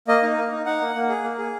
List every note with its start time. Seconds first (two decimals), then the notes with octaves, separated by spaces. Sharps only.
0.08 A#3 D#5
0.23 D#4
0.37 A#3
0.52 D#4
0.66 D#4 F#5
0.81 A#3
0.96 A#3
1.09 G#4
1.24 A#3
1.38 G#4